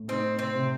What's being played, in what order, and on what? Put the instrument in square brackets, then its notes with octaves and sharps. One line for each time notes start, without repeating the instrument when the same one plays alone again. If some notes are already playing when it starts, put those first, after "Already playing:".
Already playing: [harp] A2
[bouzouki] C4 [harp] D#4
[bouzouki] C4
[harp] C3